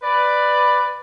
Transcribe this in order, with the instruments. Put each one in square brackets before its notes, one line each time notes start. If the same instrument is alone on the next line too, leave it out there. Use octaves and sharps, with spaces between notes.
[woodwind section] B4 D5